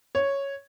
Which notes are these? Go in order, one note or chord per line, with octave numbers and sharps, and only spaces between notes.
C#5